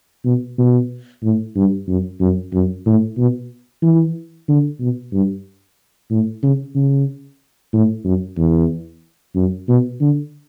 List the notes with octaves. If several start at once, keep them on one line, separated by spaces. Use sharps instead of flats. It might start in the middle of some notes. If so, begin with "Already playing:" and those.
B2
B2
A2
G2
F#2
F#2
F#2
A2
B2
E3
D3
B2
G2
A2
C#3
C#3
A2
F#2
E2
F#2
B2
D3